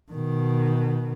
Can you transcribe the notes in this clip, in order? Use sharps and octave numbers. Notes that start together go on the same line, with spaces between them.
B2 D#3